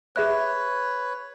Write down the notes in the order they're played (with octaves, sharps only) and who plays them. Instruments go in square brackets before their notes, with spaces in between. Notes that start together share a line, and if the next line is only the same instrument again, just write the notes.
[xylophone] G#4 E5 F#6 [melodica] B4 C#5